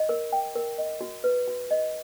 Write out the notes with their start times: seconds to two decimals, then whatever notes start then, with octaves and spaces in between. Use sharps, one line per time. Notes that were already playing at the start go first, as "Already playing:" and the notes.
Already playing: D#5
0.09 A#4
0.32 G5
0.56 A#4
0.78 D#5
1.01 F#4
1.24 B4
1.48 F#4
1.71 D#5